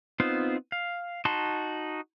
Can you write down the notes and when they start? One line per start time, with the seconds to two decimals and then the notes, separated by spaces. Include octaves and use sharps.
0.20 B3 C4 D#4 F4 C5
0.72 F5
1.25 D#4 F#4 A5 C6